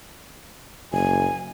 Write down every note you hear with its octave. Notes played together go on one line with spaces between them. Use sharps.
F#1 G#5